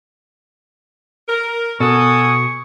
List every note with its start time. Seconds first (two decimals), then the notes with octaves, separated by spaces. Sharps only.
1.28 A#4
1.80 B2 F#4 A4 G#5 C#6 D#6